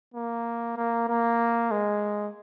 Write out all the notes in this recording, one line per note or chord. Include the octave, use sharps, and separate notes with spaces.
A#3
A#3
A#3
G#3